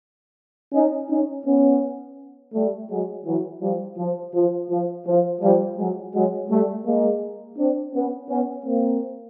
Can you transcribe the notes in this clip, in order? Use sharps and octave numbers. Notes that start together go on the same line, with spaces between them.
C#4 D#4
C#4 D#4
B3 C#4
G3 A3
F#3 G#3
E3 F#3
F3 G3
F3
F3
F3
F3
F3 G3
F#3 G#3
F#3 G#3
G3 A3
G#3 A#3
C4 D4
B3 C#4
B3 C#4
A#3 C4